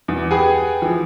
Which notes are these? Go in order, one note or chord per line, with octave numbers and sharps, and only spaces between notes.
E2
G4 G#4 B4 F#5 G#5
E3 F3